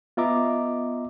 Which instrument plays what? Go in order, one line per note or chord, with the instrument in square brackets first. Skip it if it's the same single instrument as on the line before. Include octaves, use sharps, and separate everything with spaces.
[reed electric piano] B3 F4 D#5 E5 A#5 D6